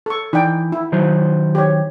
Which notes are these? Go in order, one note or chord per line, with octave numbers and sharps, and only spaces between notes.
A4 C#6
E3 D#4 D5 G5
E4
D#3 F#3 C5
G4 C#5